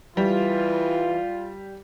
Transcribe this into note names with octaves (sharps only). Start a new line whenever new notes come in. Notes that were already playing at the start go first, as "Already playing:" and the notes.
E3 G3 F4